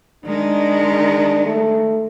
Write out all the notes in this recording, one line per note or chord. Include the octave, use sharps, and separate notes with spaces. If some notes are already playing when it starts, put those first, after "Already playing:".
D#3 G#3 D4
A3